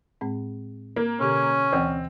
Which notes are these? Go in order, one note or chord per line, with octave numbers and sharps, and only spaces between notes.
A2 G#3 C4
A#3
B2 D3 C#4 G4
D2 E3 C4 F#5